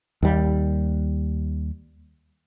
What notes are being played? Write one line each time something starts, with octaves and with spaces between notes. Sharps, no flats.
D#2 G3